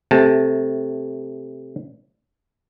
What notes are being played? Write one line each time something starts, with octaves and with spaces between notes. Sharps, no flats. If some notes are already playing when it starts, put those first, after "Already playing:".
C3 A3 A5